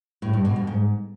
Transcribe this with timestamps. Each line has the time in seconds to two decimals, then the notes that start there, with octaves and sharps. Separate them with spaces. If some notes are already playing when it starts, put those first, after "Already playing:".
0.22 A2
0.33 G2
0.45 B2
0.56 F2
0.67 G#2